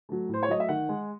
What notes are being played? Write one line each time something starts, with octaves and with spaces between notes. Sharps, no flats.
F#3 A3
A2 C5
C#5
F#3 A3 D#5
E5
D#3 F#5
G#3